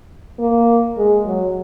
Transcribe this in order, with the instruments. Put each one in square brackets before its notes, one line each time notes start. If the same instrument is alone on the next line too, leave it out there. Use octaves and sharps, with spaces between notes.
[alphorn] A#3
G#3
F#3